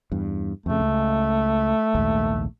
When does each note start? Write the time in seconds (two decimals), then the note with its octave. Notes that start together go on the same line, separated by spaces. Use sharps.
0.12 E2 G2
0.66 F2 C#3 A3
0.80 C#2
1.95 A#1 D#2 G#2